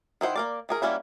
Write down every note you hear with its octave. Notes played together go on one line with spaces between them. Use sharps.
D#3 E4 C5 F#5
A#3 A#4 D5
E3 G#4 A#4
G3 A#3 C#4 E4 F#4